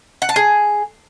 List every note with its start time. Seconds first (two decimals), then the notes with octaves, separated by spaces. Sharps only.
0.22 F#5
0.29 A5
0.36 G#4